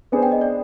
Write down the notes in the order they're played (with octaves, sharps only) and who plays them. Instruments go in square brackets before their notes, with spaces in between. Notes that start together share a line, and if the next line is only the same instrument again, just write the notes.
[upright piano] B3 D4 G#4 C5 [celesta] G#5
[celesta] G5
D#5
D5